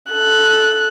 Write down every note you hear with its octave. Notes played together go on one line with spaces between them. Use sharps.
A4 F#6